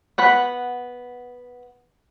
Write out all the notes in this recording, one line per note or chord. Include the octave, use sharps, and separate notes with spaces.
B3 F#5 B5